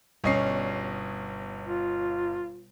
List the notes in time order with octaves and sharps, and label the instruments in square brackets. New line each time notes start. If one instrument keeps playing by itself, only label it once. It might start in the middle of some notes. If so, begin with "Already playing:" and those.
[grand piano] G1 D#5 C7 [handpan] B2 G3 [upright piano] C#4 C#5
[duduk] F4